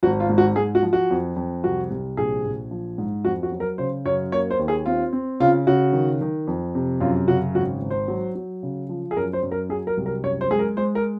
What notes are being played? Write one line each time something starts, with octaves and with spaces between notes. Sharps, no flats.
G#1 F#4
F4
G#2
F#4
G#2 G#4
F#4
F3
F#4
F2
F2
C2 F#4
C2
A#1 G#4
A#1
F3
G#2
F2 F#4
F#4
F#3
A#4
C#3 C5
F#2 C#5
A#3 C#5
C5
D#2
G#4
C4 F4
C4
C#3 F4
C#3 F#4
D#3
D#3
F2
C3
F#2 F4
C#3 F#4
G#1 F#4
G#1
C5
F#3
F#3
C#3
F3
G#4
F#2 A#4
C5
F#2
A#4
F#3 G#4
A#4
C2
A#4
F#2 C#5
C5
G#3 G#4
A#4
G#3 C5
A#4